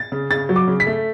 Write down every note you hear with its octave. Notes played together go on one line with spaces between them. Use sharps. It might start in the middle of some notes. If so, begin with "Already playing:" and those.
Already playing: A6
C#3
C#3 A6
F#3
D6
C#3
B6
A3